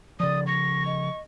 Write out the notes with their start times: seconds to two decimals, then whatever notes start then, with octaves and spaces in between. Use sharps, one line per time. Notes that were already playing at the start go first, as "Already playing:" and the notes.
0.20 C#3 F3 D5 D#6
0.47 C#6 A#6
0.85 D#5